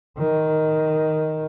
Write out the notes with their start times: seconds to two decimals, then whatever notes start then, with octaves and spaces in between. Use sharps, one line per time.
0.18 D#3